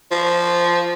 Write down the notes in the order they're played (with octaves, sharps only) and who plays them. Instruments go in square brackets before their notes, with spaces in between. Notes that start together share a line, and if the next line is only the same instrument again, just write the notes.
[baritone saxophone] F3